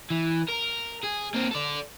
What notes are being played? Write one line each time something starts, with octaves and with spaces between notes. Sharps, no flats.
E3
A#4
G#4
A#3 C4
A4 D5